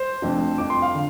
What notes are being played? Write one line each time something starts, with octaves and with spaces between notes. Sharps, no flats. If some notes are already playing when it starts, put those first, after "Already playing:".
Already playing: C5
F1 F2 F3 D4
F2 F3 C4 D6
C6
F5
D3